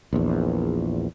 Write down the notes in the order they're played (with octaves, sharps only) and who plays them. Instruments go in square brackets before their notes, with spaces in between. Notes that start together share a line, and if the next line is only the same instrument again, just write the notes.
[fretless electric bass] A#1 E2